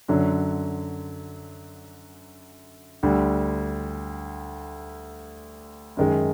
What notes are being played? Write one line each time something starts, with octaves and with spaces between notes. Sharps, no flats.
F#2 D3 F#3
D2 D3 G3
F#2 D#3 G#3